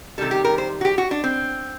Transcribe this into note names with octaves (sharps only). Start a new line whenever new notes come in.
C3 D#3 G3 A4
G4
A#4
C5
F#4
G4
F#4
D4
C4